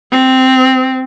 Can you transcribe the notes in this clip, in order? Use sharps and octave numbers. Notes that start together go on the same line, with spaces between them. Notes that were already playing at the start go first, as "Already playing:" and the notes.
C4